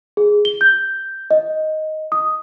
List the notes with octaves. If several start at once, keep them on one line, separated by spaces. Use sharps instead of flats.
G#4
G7
G6
D#5
D#6